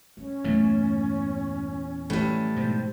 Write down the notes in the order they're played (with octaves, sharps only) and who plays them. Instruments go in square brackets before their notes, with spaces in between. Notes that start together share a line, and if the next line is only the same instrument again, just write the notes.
[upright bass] G3 [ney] C#4
[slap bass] E2 A#2 F#3 [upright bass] G2 A3
[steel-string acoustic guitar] A2 G3 [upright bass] E3 F3
[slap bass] G#2 B2 [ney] C5